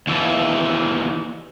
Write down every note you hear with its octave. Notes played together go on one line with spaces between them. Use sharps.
D#2 E3